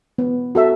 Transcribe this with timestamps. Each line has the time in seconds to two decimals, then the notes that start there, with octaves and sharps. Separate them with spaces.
0.18 B3
0.55 F#4 A4 E5